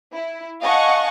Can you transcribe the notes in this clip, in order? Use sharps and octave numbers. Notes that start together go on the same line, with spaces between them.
E4
D#5 F5 F#5 G#5 A5 C#6